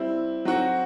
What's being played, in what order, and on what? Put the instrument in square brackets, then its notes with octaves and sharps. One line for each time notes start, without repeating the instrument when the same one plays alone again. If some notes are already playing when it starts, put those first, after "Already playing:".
Already playing: [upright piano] G3 C4 E4
F#3 C4 F#4